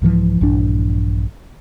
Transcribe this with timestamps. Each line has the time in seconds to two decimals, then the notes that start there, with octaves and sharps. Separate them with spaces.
0.02 C2 G#2 E3 F3
0.41 A#1 G2 E3 D4